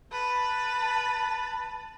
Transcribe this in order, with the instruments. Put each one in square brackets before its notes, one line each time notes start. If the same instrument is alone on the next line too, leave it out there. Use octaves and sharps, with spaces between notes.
[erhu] B4 [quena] A5